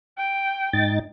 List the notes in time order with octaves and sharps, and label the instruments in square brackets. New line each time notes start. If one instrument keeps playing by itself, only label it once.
[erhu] G5
[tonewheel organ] G#2 D#4 A6